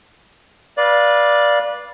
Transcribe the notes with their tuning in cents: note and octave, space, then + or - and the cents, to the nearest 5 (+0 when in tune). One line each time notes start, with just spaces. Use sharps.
B4 -25 D5 +0 F5 +0